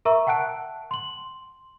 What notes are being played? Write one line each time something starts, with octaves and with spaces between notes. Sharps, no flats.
A#4 E5 A#5 C#6 E6
F#5 G5 A5 F#6 D7
C6 F#7